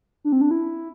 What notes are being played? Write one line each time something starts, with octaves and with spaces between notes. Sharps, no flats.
D4
C4
D4
E4